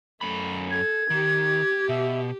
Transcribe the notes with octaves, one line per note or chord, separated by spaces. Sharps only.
F#2 A3 B5
A4 G#6
D#3 G4
B2 E5